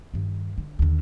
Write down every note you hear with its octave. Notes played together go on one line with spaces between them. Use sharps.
G2 D#3
D3
D#2 D3